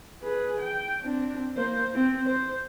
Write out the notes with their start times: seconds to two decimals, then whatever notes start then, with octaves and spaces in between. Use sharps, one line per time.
0.23 G#4 B4
0.60 G5
1.02 C4 D4
1.57 A#3 C5
1.94 C4
2.27 C5